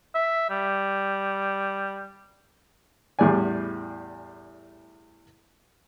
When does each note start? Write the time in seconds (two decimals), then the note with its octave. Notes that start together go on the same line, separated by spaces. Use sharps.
0.15 E5
0.50 G3
3.19 E2 A2 G3 G#4 D5 G#5